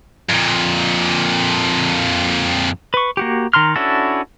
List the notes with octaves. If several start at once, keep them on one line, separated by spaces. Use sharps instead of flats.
F2 A#2
B4 C#6
A#3 F#4 G4
D#3 A#5 C6 F6
C#4 D4 E4 F#4 A4